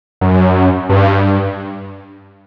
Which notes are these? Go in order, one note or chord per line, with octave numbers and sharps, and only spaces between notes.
F#2
G2